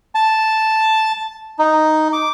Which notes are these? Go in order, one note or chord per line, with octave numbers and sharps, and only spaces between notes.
A5
D#4
D6